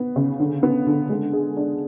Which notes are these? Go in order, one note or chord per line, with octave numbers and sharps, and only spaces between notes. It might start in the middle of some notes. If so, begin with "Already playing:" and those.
Already playing: B3
C#3
D3
B3
D3
G#3
G#4
D4